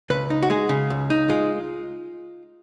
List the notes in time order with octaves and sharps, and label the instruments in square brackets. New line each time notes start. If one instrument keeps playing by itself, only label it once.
[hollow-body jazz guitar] C#2 B4
D#4
F#4
G#3 G#4
C#3
C#2
D#4
G#3 F4